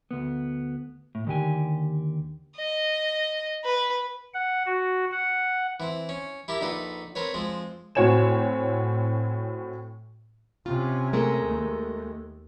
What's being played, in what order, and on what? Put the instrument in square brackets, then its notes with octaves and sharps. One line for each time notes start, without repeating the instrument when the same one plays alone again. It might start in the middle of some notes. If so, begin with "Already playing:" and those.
[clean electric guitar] D2 B3
A2
D#2 D3 G4 G#5
[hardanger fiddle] D#5
B4
[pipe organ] F#5
F#4
F#5
[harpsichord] E3 C4
C#4
E4 G4 A#4 A5
A#1 D#4 A4 B4
C4 A#4 B4 C#5
F3 G#3 C4
[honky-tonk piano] A2 C4 F#4 C#5 G#5 E7
[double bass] C3 C#4 [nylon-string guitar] F4
[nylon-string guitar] G#3 A3 A#4
[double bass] D#2